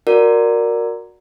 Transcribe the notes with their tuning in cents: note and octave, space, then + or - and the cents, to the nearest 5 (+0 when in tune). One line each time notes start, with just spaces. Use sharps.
F#4 -15 A#4 +0 D5 +0